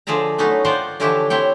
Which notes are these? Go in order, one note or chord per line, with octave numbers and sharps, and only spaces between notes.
D3 F3 G#4 D5 E5 A#5
F#3 A3 B3 C#4 D#4
F4 A#4 C5 D5 F#5 G5
D3 E3 F3 E4 G4 C#5
C4 E4 C#5 G5